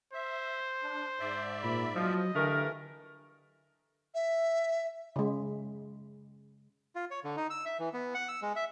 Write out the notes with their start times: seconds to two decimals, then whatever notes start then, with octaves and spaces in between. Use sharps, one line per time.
0.14 C5 E5
0.82 D4
1.20 G#2 D5 E5
1.63 A#2 B5
1.96 F3 F#3 D#5
2.35 G2 D3 E3 A3 A#4
4.15 E5
5.16 C#3 G#3
6.95 F4
7.11 C#5
7.24 D3
7.37 D#4
7.50 E6
7.65 E5
7.79 E3
7.93 B3
8.14 F#5
8.29 E6
8.42 G#3
8.56 E5